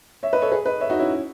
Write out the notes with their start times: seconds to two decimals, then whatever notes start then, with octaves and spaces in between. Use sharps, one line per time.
0.23 C#5 E5
0.33 B4 D#5
0.42 A4 C#5
0.51 G#4 B4
0.66 B4 D#5
0.80 C#5 E5
0.90 D#4 F#4
0.99 C#4 E4